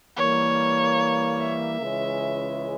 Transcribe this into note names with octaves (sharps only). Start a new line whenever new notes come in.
E3 G3 A#3 C#5
E5
C#2 C#3 E3 G#3 C#4